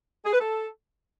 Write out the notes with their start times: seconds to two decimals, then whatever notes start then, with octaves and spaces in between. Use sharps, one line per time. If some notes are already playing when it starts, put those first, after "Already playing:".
0.25 G#4
0.32 B4
0.40 A4